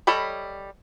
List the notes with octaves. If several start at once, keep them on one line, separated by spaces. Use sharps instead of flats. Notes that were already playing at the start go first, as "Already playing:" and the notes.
G3 A4 C#5 D#5 B5